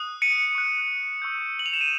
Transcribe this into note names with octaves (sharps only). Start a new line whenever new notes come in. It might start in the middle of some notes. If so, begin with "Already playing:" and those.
Already playing: D#6 F#6
C#7 D#7
C#6 F#6
C#6 E6 G6
F#7
F7
E7
D#7